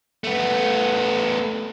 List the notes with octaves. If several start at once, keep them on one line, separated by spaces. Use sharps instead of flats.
A3 B3